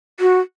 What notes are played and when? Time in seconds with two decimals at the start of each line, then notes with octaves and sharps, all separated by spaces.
0.20 F#4